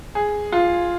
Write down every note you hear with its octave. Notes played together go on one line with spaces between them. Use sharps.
G#4
F4